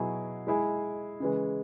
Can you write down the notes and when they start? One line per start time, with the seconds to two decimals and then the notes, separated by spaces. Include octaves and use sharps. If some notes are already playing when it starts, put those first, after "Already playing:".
Already playing: B2 F#3 E4 G#4
0.47 G#3 E4 G#4
1.20 C#3 E3 G#3